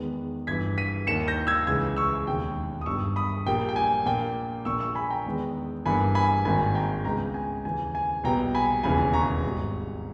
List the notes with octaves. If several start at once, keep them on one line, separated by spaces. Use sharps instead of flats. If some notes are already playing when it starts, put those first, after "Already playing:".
Already playing: E2 D#3 G#3 B3
G1 G2 E3 G#6 B6
B6 D#7
D#2 D#3 A#3 C#7 E7
G6 A#6
E6 G#6
C#2 C#3 E3 E6 G#6
C#6 E6
E1 D#2 D#3 G#3 G5
D#6
G1 G2 G3 C#6 E6
B5 D#6
A#1 A#2 G3 A#3 G5
G5
G#5
A#1 A#2 A#3 G5
A#1 A#2 A#3 C#6 E6
C#6 E6
G#5 B5
G5 A#5
E2 D#3 G#3 B3
G1 G2 E3 A#3 G#5 B5
G#5 B5
G#1 G#2 D#3 A#3 G#5 B5
G5 A#5
C#2 C#3 G#3 B3 G5 A#5
G#5
D#2 C#3 E3 G#5
G#5
B1 A#2 G3 B3 G5 A#5
G#5 B5
E1 D#2 C#3 E3 G#5 B5
A#5 C#6
G#1 G#2 G3